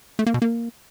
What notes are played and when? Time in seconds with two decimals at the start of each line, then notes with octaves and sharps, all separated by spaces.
0.19 A3
0.26 A#3
0.34 B2
0.42 A#3